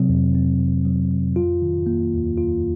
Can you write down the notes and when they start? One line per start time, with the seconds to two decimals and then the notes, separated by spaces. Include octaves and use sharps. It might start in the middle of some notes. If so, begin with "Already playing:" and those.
Already playing: C3 F#3 C4
0.09 F2
0.35 C4
0.60 C3
0.85 F#3
1.11 F2
1.36 F4
1.62 D#3
1.86 A#3
2.13 D#2
2.38 F4